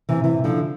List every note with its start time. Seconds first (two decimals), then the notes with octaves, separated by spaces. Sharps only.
0.09 C3 E3
0.24 C3 E3
0.44 D3 F3